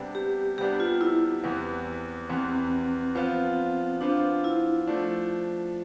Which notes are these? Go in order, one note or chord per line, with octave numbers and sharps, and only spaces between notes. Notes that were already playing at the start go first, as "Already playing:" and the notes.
Already playing: C3 G3 B3 D4
G4
C3 G3 B3 D4 G4
F4
E4
E2 C3 E3 B3
E2 C3 E3 B3 C4
F3 B3 F4 C5
F3 B3 D4 F4 C5
E4
F3 A3 D4